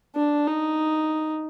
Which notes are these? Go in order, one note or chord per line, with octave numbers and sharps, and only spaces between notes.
D4
D#4